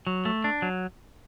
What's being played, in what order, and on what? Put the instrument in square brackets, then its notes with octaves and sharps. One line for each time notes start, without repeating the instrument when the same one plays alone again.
[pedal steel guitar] F#3
A3
D4
F#3